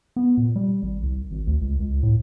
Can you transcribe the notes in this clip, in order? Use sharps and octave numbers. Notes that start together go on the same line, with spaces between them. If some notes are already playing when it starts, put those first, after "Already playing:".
B3
A#2
G3
G#1
C2
G#1
D2
C#2
C#2
A2